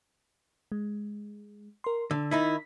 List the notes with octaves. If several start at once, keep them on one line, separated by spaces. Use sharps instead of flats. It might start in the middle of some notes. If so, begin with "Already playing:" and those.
G#3
A#4 C6
D3 E6
D#3 D#4 E4 B6